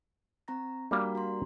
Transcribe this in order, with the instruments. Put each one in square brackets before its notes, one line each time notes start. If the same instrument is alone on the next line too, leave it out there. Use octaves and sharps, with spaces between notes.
[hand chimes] C4 A#5 A#6
[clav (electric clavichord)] G3 A#3 D4 [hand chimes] F#4 F5
[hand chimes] F#4 A#5 C6